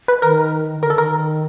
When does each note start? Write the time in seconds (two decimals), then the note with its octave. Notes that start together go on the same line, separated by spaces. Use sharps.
0.08 B4
0.22 D#3 A#4
0.82 D3 A#4
0.90 A4
0.97 D#3 A#4